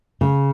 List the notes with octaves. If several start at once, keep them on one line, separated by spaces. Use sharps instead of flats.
C#3